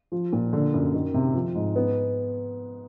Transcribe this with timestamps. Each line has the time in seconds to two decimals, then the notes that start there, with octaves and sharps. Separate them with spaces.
0.12 F3
0.33 A#2
0.53 D3
0.74 F#2
0.94 D#3
1.14 C3
1.35 F3
1.55 G#2
1.76 B3